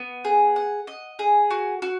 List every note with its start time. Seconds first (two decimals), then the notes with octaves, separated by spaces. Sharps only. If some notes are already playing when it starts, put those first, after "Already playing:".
Already playing: B3
0.25 G#4
0.56 F#5
0.87 D#5
1.19 G#4
1.50 F#4
1.82 F#4